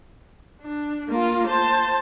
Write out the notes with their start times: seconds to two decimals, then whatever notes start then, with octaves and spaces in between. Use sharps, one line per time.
0.62 D4
1.09 A#3 F4
1.48 C5 A5